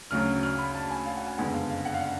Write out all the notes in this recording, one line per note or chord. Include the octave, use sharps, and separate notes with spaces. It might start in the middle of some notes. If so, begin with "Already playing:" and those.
D2 C#3 F#3 C#4 F6
F6
B5
A5
G#5
F5
F#5
G#5
F#1 F2 D3 G#3 B3 F#5
F5
F5
F#5
F5
F#5